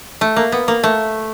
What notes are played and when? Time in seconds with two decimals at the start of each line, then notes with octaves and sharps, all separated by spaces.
0.21 A3
0.36 A#3
0.52 B3
0.68 A#3
0.83 A3